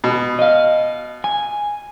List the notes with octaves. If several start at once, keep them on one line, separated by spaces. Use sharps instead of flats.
B2
D#5 F5
G#5